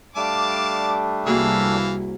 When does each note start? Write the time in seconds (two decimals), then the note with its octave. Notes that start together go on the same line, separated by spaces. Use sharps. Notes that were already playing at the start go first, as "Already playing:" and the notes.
0.16 G3 A3 D4 F5 A5 D6
1.27 C2 E3 A#3 F#4 G#4 F5 E6